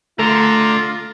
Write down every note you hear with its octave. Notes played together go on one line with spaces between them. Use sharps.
D3 A3 F4 A#5